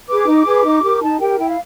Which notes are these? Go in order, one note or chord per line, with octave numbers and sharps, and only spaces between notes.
G#4 B4 D6
D#4
G#4 B4
D#4
G4 A#4
D#4 A5
G4 A#4 G5
E4 G5
F5